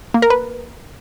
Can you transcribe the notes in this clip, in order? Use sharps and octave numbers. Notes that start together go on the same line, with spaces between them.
A#3
A#4
B4